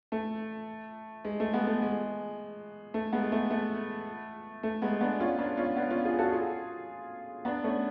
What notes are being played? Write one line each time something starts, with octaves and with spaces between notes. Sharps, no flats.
A3
G#3
A3
G#3 B3
A3
G#3
A3
G#3 B3
A3
A3
A3
G#3 B3
B3 D4
C#4 F4
B3 D4
C#4 F4
B3 D4
C#4 F4
F4 G#4
F#4 A4
F4 G#4
B3 D4
A3 C#4